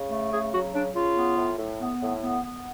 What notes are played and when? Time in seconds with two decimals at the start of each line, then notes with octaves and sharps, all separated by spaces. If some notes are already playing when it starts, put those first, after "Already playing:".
Already playing: C#3
0.09 A3
0.31 C#3 G#4
0.52 F#3 F#4
0.74 C#3 D4
0.94 C#3 F4
1.16 B3
1.37 A2
1.58 A2
1.80 B3
2.01 A2
2.22 B3
2.44 B3